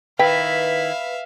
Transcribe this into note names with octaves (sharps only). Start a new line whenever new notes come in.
D#3 E4 B4 E5 F5 G5